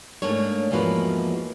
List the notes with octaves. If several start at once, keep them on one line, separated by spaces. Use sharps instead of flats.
G#2 A3 A#3 D4 C#5
E2 G#2 F3 A#3 F#4 B4